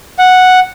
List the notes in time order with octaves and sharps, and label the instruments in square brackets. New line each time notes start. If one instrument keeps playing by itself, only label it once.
[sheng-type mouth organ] F#5